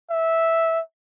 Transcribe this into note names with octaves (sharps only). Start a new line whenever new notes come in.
E5